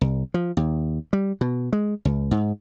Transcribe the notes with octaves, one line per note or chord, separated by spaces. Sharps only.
C2
F3
D#2
G3
B2
G#3
C#2
G#2